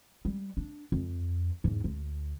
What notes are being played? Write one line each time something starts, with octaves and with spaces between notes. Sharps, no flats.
G3
D4
F2
E2 G#2
D2